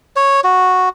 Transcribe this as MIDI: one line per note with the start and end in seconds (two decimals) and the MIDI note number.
0.16 0.40 73
0.44 0.89 66